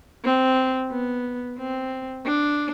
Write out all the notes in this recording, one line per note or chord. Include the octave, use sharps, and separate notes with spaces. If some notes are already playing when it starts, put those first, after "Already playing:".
C4
B3
C4
D4